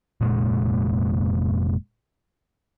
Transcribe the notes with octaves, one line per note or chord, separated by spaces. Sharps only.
F1 A#2 G#3